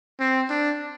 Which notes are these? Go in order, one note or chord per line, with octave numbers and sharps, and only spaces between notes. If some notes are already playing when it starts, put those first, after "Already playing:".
C4
D4